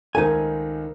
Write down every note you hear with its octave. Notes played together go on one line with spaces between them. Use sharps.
C#2 D#3 D#4 A4 A#4 C5 G#5